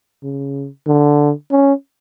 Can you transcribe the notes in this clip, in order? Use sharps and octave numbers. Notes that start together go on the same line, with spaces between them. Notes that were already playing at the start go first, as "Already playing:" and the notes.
C#3
D3
C#4